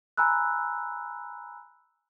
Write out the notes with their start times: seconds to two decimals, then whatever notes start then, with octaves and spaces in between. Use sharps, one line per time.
0.17 G#5 A#5 B5 E6 F#6